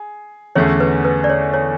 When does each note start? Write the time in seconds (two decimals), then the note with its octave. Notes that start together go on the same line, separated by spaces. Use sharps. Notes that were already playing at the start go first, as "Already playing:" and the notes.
Already playing: G#4
0.55 E2 D3 A3 C#4 G#4 C#5
0.80 B4
1.05 B4
1.24 D5
1.30 C#5
1.54 C#5